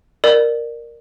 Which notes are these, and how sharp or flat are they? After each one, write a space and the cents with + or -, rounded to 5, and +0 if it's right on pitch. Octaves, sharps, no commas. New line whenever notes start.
A#4 +0 D5 +30